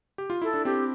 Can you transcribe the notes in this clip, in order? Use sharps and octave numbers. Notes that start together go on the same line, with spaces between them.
G4
F4
E4 A4
D4
C4 G4